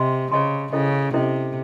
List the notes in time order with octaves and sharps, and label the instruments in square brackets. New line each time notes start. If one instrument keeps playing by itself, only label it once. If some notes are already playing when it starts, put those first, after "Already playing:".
Already playing: [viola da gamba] C3 [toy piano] C5 D#5 G#5 C6
[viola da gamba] C#3 [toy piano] C5 D#5 G#5 C6
[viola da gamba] C#3 [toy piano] C#4 E4 A4 C5 D#5
[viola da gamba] C3 [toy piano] C#4 E4 A4 C5 D#5